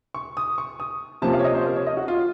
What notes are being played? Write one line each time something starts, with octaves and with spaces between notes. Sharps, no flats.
C#6
D#6
C#6
D#6
C3 F3 A#3 C#4 A5
F5
C#5
D#5
C5
A#4
C#5
D#5
F#4
F4